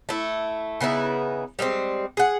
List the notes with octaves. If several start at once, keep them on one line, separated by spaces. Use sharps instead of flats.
A3 E4
C#3 B3 D#4 E4
G3 G#3 B3 C4
G#4 F#5